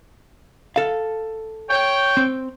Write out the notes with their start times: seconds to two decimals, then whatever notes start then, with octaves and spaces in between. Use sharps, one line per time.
0.76 A4 F5
1.70 C#5 G5
2.17 C4